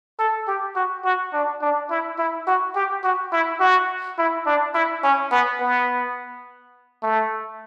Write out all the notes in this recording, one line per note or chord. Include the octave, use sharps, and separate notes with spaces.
A4
G4
F#4
F#4
D4
D4
E4
E4
F#4
G4
F#4
E4
F#4
E4
D4
E4
C#4
B3
B3
A3